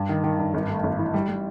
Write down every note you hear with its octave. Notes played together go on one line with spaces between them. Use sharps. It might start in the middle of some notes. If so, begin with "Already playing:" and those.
Already playing: G2
D#3
D#3
G2
G#1
A3
G#1
E3
G3
G3